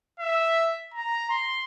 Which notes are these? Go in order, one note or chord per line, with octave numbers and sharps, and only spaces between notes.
E5
A#5
C6